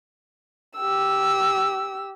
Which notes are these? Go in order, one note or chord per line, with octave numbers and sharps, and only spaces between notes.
G4 E6